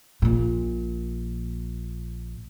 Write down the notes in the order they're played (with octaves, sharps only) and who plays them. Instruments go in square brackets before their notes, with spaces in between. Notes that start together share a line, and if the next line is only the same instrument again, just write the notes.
[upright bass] A#1 A#2